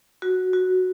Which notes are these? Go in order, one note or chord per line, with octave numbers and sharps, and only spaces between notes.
F#4
F#4